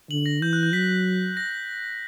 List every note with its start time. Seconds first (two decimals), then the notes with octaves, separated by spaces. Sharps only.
0.10 D3 F#7
0.26 A#6
0.41 E3 G6
0.53 F#6
0.63 G6
0.73 F#3 B6
1.37 A#6